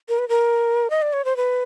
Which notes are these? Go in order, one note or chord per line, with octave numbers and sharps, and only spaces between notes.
A#4
B4
A#4
D#5
D5
C#5
C5
B4